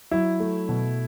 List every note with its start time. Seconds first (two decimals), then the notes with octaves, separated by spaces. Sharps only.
0.11 F#3 E4
0.40 A3
0.69 B2